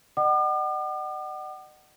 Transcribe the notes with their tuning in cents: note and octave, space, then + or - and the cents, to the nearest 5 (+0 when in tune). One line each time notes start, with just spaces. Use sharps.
D#5 -45 F#5 +30 D6 +45